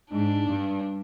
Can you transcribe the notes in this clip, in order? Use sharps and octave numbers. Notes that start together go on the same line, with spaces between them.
G#2 D4
G2